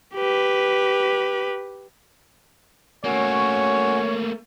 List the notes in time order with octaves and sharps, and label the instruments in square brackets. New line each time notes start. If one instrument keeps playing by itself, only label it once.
[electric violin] G4 B4
[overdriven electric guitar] A3 A#3 [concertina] C#4 F#4 [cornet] C#5